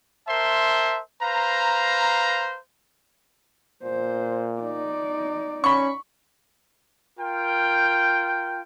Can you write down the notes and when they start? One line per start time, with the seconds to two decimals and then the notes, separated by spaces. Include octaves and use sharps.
0.27 A#4 C5 E5 A5 C6
1.21 B4 C5 F5 A#5
3.84 A#2 C5
4.61 D#4 D5
5.64 C#4 B5 C#6
7.19 F4 A#4 G5